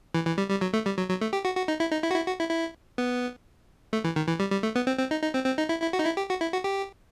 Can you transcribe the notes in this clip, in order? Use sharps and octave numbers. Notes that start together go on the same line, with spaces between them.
E3
E3
G3
G3
F#3
A3
G3
F#3
F#3
A3
G4
F#4
F#4
D#4
E4
D#4
E4
F#4
E4
F#4
E4
E4
B3
A3
E3
D#3
E3
G3
G3
A3
B3
C4
C4
D#4
D#4
C4
C4
D#4
E4
E4
F#4
D#4
E4
G4
F#4
E4
F#4
G4